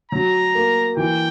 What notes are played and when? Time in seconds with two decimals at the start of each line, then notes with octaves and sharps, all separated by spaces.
0.12 F#3 A#5
0.55 A#3
0.97 E3 G5